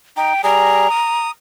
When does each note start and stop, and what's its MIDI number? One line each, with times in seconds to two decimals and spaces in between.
0.17 0.33 63
0.17 0.42 79
0.44 0.87 55
0.44 0.87 68
0.44 1.28 82
0.91 1.31 87